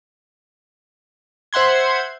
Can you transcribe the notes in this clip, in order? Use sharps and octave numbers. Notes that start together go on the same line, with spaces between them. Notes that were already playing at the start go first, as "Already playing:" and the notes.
C5 E5 F#5 C6 G#6